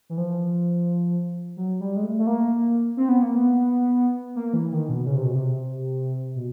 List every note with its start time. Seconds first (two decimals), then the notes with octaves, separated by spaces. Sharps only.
0.10 E3
0.18 F3
1.57 F#3
1.81 G3
1.96 G#3
2.03 A3
2.19 A3
2.27 A#3
2.97 C4
3.09 B3
3.22 A#3
3.35 B3
4.36 A#3
4.53 E3
4.72 D#3
4.89 B2
5.06 C#3
5.16 C3
5.25 B2
5.35 C3
6.35 B2